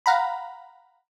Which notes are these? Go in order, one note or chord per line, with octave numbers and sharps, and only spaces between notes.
F5 F#5 A#5 B5